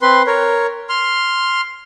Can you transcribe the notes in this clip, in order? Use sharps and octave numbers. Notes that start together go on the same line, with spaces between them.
C4 B4 C6
A#4 C#5
C6 F6